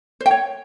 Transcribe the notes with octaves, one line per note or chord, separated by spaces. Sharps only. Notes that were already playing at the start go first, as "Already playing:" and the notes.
C5
G5
C#5